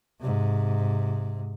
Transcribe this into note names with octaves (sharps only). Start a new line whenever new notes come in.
G#2 C3